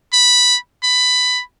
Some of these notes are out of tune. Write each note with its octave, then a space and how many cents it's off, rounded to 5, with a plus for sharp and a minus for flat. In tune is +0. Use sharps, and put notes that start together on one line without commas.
B5 -5
B5 +15